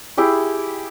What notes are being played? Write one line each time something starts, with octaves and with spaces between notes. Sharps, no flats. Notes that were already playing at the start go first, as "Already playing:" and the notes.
E4 G4 G#4